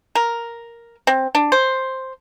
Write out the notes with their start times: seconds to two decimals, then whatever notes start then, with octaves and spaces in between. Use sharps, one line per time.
0.15 A#4
1.07 C4
1.35 D4
1.52 C5